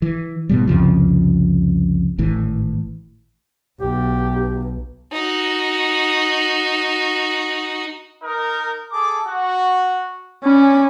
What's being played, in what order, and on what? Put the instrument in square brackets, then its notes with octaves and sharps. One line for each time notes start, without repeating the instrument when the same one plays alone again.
[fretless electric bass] E3
G#2 B2 G3
C2 F2 C#3 F3
G#1 A2 E3
[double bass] B1 [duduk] G4
[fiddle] D#4 F#4
[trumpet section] D#4 A#4
G#4 A4 D6
F#4
[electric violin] C#4 [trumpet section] D5 G#5 B5